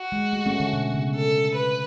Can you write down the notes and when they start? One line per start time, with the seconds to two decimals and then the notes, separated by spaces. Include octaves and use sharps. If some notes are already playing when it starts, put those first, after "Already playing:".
Already playing: F#4
0.12 G#3
0.33 A3
0.46 A3 C#4
0.60 D3
0.73 B2
0.94 C#3
1.15 A4
1.55 B4